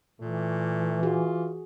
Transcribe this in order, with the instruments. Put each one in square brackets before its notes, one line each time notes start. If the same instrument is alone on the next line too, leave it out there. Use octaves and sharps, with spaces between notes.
[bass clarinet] A#2 [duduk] E3 [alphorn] A3
[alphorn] F4 [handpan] F#4 G#4